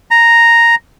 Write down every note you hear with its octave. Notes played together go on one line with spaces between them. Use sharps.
A#5